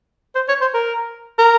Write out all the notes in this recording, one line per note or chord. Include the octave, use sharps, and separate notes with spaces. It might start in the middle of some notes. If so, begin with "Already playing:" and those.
C5
C#5
C5
A#4
A#4